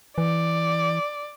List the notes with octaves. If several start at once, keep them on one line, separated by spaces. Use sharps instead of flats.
E3 D5